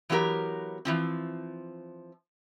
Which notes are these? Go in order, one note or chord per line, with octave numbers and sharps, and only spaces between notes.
E3 F#3 B3 G4 A#4
E3 F3 C4